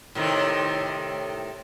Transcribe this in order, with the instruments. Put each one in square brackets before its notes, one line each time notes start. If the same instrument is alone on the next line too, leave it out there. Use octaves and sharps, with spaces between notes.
[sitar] A2 C3 D#3